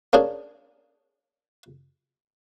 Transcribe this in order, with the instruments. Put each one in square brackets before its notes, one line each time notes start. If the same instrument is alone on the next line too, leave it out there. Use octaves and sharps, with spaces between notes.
[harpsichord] A#3 C#4 D4 G#4